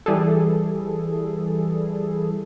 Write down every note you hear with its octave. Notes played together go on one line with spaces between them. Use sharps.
E3 G3 G#4 A4